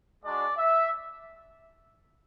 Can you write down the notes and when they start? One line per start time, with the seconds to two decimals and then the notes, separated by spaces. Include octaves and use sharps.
0.25 G#3 D4 F#4 D5
0.57 E5